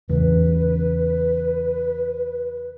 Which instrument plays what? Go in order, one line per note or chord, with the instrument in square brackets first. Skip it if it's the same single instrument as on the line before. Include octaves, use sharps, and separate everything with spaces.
[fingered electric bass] E2 C#3 [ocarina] B4